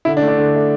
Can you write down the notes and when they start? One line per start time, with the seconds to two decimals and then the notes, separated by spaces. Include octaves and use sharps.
0.05 D3 E4
0.17 D4
0.22 A3
0.28 D4
0.38 D3
0.55 A3